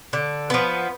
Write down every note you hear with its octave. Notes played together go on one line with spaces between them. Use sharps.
D3
F3 B3